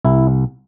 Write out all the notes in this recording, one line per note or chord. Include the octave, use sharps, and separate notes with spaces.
C2 E4